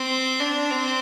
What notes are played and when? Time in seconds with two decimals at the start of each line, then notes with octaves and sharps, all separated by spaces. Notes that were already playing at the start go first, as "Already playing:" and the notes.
Already playing: C4
0.40 D4
0.71 C4